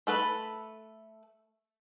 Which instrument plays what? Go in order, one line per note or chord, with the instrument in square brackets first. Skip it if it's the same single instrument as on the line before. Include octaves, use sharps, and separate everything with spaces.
[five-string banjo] A3 A4 B4 B5